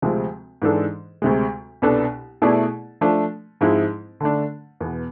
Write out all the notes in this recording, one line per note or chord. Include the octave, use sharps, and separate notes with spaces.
D2 C3 F3 G#3 C4
G#2 E3 G#3 D4 A4
D2 C3 G#3
C2 B2 B3 D4 A4
B2 A3 E4 G#4 D5
F3 A3 D4
G#2 F3 G#3 C4 E4
D3 A3 D4
E2 B2 B3